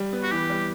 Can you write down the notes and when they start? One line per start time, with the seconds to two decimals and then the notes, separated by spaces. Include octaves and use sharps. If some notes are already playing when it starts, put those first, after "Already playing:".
Already playing: G3
0.13 B3
0.23 F#4
0.31 E3 G4
0.50 G3